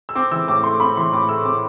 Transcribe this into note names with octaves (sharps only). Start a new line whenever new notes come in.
E6
C4 D6
E3 E6
A2 D6
A3 C6
C4 B5
E3 C6
A2 D6
A3 E6
C4 D6